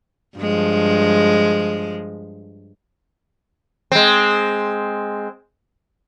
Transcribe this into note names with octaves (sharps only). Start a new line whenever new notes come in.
G2 F3 G#3
G#3 C4